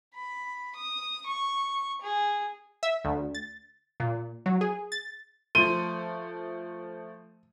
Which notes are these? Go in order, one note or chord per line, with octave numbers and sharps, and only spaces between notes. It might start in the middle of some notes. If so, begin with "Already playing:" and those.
B5
D#6
C#6
G#4
E5
D2
A6
A#2
F#3
G#4
A6
F3 A3 C6 D#7